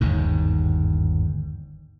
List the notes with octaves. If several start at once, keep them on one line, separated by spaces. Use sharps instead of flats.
G1 D#2 G#2